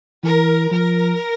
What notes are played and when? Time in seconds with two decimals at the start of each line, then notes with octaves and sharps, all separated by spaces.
0.24 E3 A#4
0.71 F3 A#4